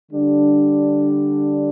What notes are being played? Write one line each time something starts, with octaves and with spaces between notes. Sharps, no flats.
D3 G3 D4